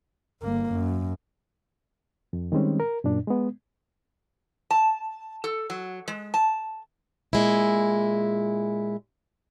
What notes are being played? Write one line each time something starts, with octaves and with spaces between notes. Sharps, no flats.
G1 A#3
F#2
F2
D#3 G3 G#3 C4 C#4
A#4
F#2 A#2 D4
G#3 B3
A5
A4
F#3
G#3
A5
A#2 G#3 E4